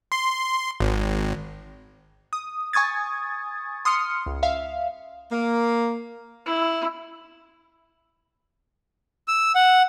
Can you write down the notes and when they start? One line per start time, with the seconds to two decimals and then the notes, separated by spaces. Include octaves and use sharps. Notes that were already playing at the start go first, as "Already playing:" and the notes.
0.12 C6
0.80 G#1
2.33 D#6
2.73 G#5 C#6 D#6 G#6 A6
3.85 C6 D#6 F6 C#7
4.26 C#2
4.43 E5 F5
5.32 A#3
6.46 E4
9.28 E6
9.55 F#5